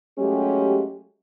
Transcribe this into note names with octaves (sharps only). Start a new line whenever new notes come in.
F#3 G#3 A3 C#4 G4